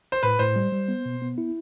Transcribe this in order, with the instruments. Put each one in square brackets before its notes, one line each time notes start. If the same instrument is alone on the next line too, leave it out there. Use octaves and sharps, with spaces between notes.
[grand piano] C5
[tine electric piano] A2 [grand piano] B4
[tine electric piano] A2 [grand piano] C5
[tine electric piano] G3
G3
B3
B2
B3
E4